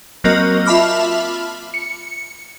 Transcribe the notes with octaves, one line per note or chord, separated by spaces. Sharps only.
F#3 A#3 C4 F#4 A#4 D#5
F4 E5 A5 B5 D6 F6
C#7